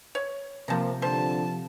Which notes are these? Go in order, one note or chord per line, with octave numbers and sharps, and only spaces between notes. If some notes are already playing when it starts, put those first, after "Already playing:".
C#5
C3 F3 A#3 A5 A#5
D3 C5 A5